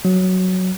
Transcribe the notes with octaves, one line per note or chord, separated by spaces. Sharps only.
F#3